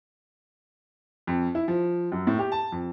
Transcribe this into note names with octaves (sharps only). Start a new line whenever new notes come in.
F2
E4
F3
F#2
A2
G4
A5
F2